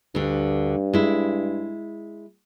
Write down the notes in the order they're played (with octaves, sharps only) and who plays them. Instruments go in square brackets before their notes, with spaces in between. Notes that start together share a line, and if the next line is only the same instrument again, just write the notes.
[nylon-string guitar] D2 D3 [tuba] G2
[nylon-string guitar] G#3 E4